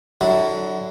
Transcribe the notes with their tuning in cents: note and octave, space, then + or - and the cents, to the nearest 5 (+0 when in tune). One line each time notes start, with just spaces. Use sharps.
D3 +10 F#3 +20 E4 -25